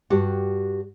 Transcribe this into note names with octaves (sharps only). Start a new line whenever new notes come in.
G2 F#4 G4 F#5